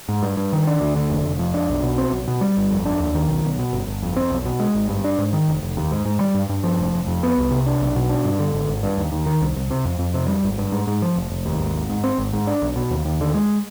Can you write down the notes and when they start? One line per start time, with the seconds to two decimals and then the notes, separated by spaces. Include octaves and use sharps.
0.09 G#2
0.23 G2
0.37 G2
0.53 D#3
0.67 D4
0.81 D2
0.96 D3
1.10 F1
1.25 F1
1.39 F2
1.54 D4
1.69 B1
1.83 B2
1.98 C4
2.12 B1
2.28 B2
2.41 G3
2.57 G1
2.70 F2
2.85 D4
3.00 D#2
3.15 D#3
3.29 B1
3.44 B1
3.59 B2
3.73 G1
3.87 G1
4.02 F2
4.16 C4
4.30 B1
4.45 B2
4.60 G#3
4.75 G#1
4.89 G2
5.04 D4
5.18 G#2
5.33 D#3
5.48 F1
5.63 F1
5.77 D#2
5.91 G#2
6.06 G#2
6.20 G3
6.35 G2
6.49 G2
6.64 F3
6.79 F1
6.94 F1
7.07 F2
7.23 B3
7.38 C2
7.51 C3
7.66 D4
7.81 B1
7.96 B2
8.09 D4
8.25 G2
8.39 D3
8.54 G#1
8.69 G#1
8.83 G2
8.97 D#2
9.12 D#2
9.26 D#3
9.41 C2
9.56 C2
9.70 C3
9.85 F2
9.99 F2
10.14 C3
10.28 G3
10.43 G#1
10.58 G2
10.72 G#2
10.87 G#2
11.02 F3
11.16 F1
11.30 F1
11.46 D#2
11.59 G#1
11.74 G#1
11.90 G#2
12.04 C4
12.18 G#1
12.33 G#2
12.47 D4
12.62 B1
12.76 B2
12.91 D#2
13.05 D#2
13.21 D3
13.34 G#3